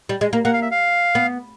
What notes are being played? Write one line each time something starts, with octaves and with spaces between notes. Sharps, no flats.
G3
G#3
A#3
A#3 F#5
F5
E5
F5
B3